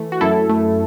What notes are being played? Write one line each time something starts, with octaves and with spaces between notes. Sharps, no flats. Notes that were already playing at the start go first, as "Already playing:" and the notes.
Already playing: E3 A3
F#4
F#2 E4 A4
A3